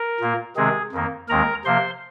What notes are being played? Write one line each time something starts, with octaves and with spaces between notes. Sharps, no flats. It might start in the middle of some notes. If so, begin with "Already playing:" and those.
Already playing: A#4
A#2 A#3
C3 D#3 G#3 C4 G#4
F2 D#3 A#3
D#2 D#3 G#3 C4 A#4 A#5
C3 F3 A#3 C5 C6